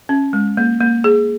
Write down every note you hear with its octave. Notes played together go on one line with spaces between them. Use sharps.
C#4
G#3
A#3
A#3
G#4